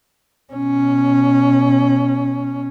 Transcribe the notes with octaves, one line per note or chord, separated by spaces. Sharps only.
B2 C#4